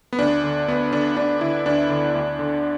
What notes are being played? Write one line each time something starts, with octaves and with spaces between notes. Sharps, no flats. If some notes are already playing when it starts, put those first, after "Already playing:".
B3
D2 D4
D3
D2 B3
D3 D4
D2 D4
D3 E4
D2 D4
D3
D2
D3